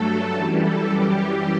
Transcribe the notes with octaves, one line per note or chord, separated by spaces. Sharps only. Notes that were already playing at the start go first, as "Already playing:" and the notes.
Already playing: G2 F#3 A3 A4
F#2 E3 G3 A4
A4
F#2 E3 G3 G4